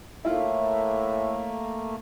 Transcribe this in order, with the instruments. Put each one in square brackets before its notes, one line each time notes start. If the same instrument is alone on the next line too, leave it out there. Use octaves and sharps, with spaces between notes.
[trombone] A2 [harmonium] A3 A#3 [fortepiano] E4 F4 [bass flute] E5